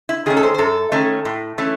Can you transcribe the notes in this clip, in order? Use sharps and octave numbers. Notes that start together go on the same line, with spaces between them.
E4
D#3 A3 C#4 G#4
A4
C5
C5
F#2 A4
D#3 A3 C#4
A2
E3 A3 C#4